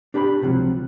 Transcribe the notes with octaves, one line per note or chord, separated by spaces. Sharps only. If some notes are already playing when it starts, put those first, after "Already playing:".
D4 G4 D5 A#5 B5
C#2 C3 F3 F#3